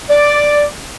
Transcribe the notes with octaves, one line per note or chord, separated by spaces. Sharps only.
D5